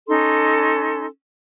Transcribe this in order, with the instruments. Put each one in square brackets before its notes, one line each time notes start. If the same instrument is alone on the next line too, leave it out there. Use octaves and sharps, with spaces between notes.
[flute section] C#4 D#4 A4 C6